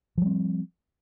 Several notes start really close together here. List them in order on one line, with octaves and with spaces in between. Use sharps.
F3 G3 C4